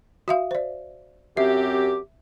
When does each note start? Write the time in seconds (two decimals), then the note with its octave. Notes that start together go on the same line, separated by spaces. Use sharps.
0.28 F#4 E5 F5
0.51 C5 D5
1.37 F#2 C4 G4 E5